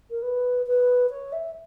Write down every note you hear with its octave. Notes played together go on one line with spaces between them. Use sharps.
A#4
B4
B4
C#5
E5